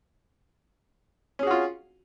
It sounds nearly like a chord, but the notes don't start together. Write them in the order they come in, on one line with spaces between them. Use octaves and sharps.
C#4 G#4 F#4 F4